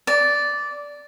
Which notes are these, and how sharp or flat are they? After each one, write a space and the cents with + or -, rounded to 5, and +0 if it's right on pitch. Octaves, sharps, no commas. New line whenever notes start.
D5 -10